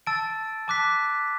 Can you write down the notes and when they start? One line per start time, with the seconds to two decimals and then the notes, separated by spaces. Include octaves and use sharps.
0.07 A5 E6 A6 D7
0.68 A5 D6 F#6 B6